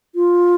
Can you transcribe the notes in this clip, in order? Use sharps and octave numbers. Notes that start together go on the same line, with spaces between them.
F4